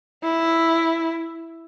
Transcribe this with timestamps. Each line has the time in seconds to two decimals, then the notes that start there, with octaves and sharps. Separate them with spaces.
0.24 E4